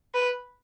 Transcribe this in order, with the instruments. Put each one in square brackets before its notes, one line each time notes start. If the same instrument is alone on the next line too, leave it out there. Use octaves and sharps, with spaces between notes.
[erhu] B4